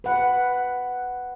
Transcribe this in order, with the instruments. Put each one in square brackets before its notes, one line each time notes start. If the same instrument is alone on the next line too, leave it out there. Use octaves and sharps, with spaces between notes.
[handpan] B4 F#5